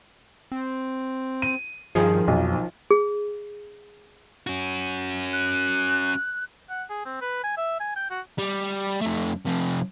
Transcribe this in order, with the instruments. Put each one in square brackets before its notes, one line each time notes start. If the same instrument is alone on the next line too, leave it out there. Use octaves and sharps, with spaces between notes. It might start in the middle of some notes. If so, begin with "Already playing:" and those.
[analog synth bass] C4
[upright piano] D#7
[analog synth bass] G2 [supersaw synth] D#3 F3 [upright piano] G#4
[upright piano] B1 [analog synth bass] F2
[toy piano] G#4
[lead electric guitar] C#4 F#4
[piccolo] F#6
[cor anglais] F#5
G#4
C4
B4
G#5
E5
G#5
G5
F#4
[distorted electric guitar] G3
F2 A3
C3 F3